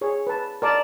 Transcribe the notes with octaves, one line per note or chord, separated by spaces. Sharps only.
G#4 C#5
B4 A5
A#4 D5 A5